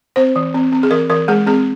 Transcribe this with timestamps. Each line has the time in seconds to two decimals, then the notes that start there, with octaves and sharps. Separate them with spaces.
0.16 C4 C5
0.36 E3
0.54 C4
0.72 C4
0.83 G#4
0.91 E3 A#4
1.10 E3 A#4
1.28 G#3 G#4
1.46 C4 G#4